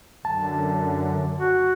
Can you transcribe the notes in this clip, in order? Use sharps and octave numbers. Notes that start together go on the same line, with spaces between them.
F#2 D3 A5
F#4